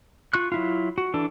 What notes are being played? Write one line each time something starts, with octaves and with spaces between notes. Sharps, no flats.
F4 C#6 F#6
F#3 E4 F4
F#4
E3 D4 A4